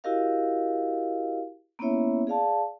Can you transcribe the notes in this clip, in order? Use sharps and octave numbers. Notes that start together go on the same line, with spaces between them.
E4 F#4 G4 A#4 D#5 F5
A#3 B3 C#4 E4 C#5 E5
G#4 D5 F5 A5